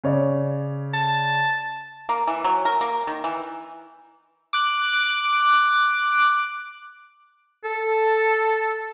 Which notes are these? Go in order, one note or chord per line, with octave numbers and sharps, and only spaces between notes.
C#3 C#5 D5
A5
A#3
E3
F#3
A#4
A#3
D#3
E3
D6 F#6
A4